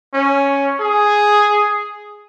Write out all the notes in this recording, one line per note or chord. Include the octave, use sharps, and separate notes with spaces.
C#4
G#4